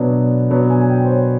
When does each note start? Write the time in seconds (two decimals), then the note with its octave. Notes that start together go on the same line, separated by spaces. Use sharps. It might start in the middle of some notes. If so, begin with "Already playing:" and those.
Already playing: B2 F#3 B3 D4
0.50 B2 F#3 B3 D4
0.70 G#5
0.81 G#5
0.89 G5
1.04 C5
1.09 C#5